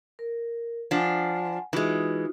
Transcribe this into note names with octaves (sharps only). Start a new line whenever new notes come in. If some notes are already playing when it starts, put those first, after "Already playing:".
A#4
F3 D4 F#5 G#5
E3 G#3 D#4 F4 F#4